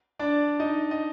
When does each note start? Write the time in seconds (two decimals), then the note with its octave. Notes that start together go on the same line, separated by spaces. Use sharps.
0.19 D4 D5
0.59 D#4 D#5
0.91 D#5